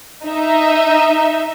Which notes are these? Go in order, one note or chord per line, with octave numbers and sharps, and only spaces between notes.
D#4 E5